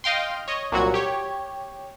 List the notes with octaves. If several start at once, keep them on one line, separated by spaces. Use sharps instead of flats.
D#5 F5 G5 C6
C#5 D#5
C2 A#2 F#3 F#4 G#6
G4 C#5